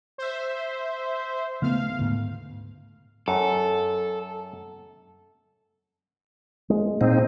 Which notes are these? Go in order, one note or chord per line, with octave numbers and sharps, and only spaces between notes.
C5 E5
C#3 A3 B3 F5
D2 G#2
F#2 A4
G#3
A#2 C4 D#4